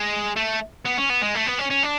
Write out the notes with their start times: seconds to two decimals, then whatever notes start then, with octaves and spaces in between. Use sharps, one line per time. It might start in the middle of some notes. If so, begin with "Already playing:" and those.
Already playing: G#3
0.36 A3
0.85 B3
0.97 C#4
1.09 B3
1.22 G#3
1.35 A3
1.46 B3
1.59 C#4
1.70 C#4
1.83 D4